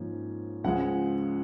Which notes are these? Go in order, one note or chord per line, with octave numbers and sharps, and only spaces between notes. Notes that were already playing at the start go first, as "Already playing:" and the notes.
Already playing: G#2 F3 A#3 C#4
C#2 C#3 F3 G#3 F#5